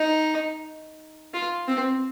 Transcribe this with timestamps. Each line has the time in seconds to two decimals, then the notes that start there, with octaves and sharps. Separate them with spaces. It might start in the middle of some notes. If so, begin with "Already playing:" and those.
Already playing: D#4
1.34 F4
1.68 C4